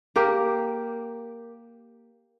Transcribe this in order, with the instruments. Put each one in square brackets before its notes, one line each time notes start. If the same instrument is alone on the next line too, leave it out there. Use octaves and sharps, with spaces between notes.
[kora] A#3 G4 A#4